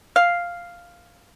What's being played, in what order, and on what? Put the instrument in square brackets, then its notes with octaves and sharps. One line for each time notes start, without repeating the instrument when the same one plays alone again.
[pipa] F5